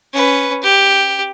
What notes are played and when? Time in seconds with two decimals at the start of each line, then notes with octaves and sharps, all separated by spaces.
0.13 C#4 B4
0.63 G4